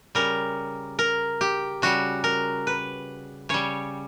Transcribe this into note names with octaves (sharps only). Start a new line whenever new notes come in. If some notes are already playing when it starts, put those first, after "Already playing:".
C#3 G3 A#4
A#4
G4
C#3 G3 F#4
A#4
B4
C#3 G3 C#5